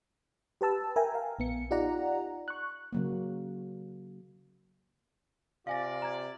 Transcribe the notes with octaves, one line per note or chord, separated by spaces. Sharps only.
G4 B4 A5 E6
A#4 E5 G5 G#5 A#5
F5
A#1 B3 C#7
D#4 F4 G4 D5 F#5 A#5
C#6 F#6
C#3 F#3 A#3
C3 F4 D5 F5 G#5 A#6
A#5 G#6